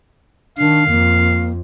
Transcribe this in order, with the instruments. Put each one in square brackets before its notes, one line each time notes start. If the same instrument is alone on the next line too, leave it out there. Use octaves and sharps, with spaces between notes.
[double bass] D#3 [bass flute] D4 [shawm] F5
[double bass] F2 [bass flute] A#3